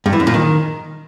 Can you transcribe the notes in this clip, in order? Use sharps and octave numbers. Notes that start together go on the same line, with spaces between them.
G2
E3
F#2
A#2
D#3